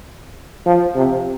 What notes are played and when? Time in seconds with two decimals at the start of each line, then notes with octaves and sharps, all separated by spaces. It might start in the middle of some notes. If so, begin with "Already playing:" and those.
0.66 F3
0.95 C3